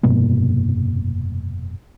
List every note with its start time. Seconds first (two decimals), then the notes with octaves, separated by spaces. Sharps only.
0.03 F1 G2 B2 A#3